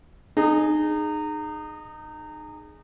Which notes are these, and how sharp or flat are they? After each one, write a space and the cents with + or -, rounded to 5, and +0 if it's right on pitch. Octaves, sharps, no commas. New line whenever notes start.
D#4 -25 G#4 +5